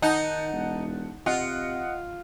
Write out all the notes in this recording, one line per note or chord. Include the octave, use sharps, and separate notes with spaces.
D#3 D#4 F#5 A5 G6
E1
C3 F4 D#5 F#5